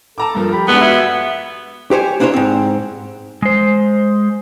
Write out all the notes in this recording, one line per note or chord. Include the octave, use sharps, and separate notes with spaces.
A4 A5 A#5 D6
G2 F3 A#4
G4 B5
G#3 B3 D4 F#5
F#4 E5 E6 G#6
G4 C5 C#5 G#5
A#3 D4 E4 C5 C#5
G#2 C4
G#3 C5